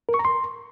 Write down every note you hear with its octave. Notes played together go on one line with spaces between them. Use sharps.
A#4
C#6
A#5
C6